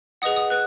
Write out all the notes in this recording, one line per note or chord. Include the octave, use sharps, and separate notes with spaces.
G#4 B4 D#5 F#5 D#6
D#6
B4 F#6